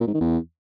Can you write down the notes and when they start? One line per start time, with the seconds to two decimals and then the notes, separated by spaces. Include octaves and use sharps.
0.01 A#2
0.07 G#2
0.14 D#3
0.21 E2